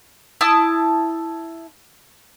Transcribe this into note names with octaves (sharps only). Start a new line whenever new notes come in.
E4 A5 D#6